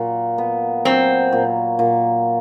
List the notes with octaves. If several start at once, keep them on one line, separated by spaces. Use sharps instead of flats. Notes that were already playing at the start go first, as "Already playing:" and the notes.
Already playing: A#2 F#3
B3
F#3 C4
A#2
A#2